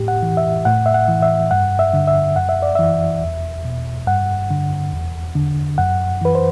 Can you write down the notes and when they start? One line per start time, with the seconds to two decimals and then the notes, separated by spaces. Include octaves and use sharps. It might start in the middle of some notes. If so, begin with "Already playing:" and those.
Already playing: A2 G4
0.08 F#5
0.22 E3
0.37 E5
0.65 A2 F#5
0.86 E5
0.94 F#5
1.08 E3
1.22 E5
1.51 G2 F#5
1.79 E5
1.94 D3
2.07 E5
2.36 F#2 F#5
2.49 E5
2.62 D5
2.75 E3 E5
3.22 E2
3.65 B2
4.07 G2 F#5
4.51 D3
4.93 E2
5.35 D3
5.78 F#2 F#5
6.21 E3 B4
6.35 C5